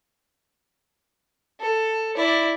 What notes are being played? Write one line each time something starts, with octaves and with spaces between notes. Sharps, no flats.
A4
E4 D5